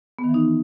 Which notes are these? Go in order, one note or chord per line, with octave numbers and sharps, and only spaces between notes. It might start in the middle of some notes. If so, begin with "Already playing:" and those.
B3
D#3
E3
D#4